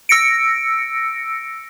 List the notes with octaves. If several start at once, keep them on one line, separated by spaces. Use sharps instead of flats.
E6 A#6 C#7 D7